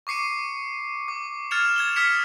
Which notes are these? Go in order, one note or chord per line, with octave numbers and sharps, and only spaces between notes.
C#6 D6 C7 C#7 D#7
D6
F6 G#6 A6 C#7 E7 F7
G#6 E7 G7
D#6 F6 G#6 B6 C#7